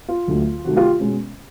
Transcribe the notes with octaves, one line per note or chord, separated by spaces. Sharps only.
F4
D2 D3 F#3 A3
C3 D#3 F#3 A3 F#4
F4 G4
B2 G#3 C#4